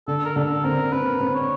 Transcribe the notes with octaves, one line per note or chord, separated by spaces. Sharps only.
D3 A4
A#4
D3 A4
C4 A#4
C4 B4
C4
C#5